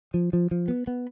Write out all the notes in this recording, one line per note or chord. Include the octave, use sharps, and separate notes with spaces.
F3
F3
F3
B3
B3